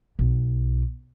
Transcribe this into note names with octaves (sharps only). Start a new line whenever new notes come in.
B1